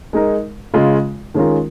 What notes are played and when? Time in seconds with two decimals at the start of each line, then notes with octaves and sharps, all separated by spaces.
0.13 G#3 D#4 A#4
0.74 C#3 G#3 F4
1.34 D#3 G#3 C#4 F4 A#4